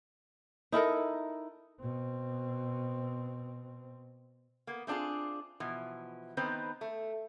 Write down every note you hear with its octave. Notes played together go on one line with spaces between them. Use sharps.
D#4 E4 A4 A#4
B2 C4
A#3 B3
A3 C4 D4 F4 G#4
B2 E3 F3
D#3 B3 C4 D#4 B4 C5
A3